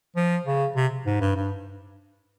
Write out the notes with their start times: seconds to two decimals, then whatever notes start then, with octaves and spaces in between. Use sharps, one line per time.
0.16 F3
0.46 C#3
0.76 C3
1.06 G#2
1.21 G2
1.36 G2